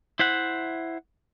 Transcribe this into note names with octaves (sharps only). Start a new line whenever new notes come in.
E4 C5 E5 F#5